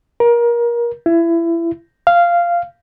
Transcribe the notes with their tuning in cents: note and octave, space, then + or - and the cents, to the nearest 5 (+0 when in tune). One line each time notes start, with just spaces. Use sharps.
A#4 +25
E4 +25
F5 -10